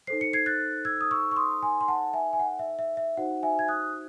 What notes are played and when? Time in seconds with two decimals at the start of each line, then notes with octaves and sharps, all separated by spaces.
0.07 D#4 A4 C5 C7
0.21 C#7
0.33 G#6 C7
0.46 F#6 A6
0.85 E6 G#6
1.01 D#6
1.11 C#6 E6
1.31 C#6
1.36 C6 D#6
1.62 G#5 C6
1.81 C6
1.88 F#5 A5
2.13 E5 G#5
2.33 G#5
2.39 F#5
2.59 E5
2.79 E5
2.97 E5
3.17 D#4 F#4 C5 F#5
3.43 E5 G#5
3.59 G#6
3.68 D#6 F#6